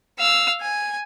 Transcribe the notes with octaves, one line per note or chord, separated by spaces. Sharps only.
F5 E6
G#5